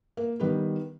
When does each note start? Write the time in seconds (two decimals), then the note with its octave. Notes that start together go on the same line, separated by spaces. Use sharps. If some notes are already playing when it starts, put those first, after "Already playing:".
0.17 A#3
0.40 D#3 G3 B3 B4